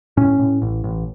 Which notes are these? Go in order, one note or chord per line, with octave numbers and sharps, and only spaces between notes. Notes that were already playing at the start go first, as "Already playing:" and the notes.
A2 C#4
A2
A1
A1